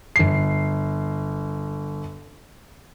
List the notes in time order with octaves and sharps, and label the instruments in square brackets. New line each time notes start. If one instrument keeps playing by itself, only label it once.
[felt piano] G1 C7